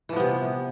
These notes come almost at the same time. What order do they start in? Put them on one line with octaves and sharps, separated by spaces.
E3 F3 B3 C3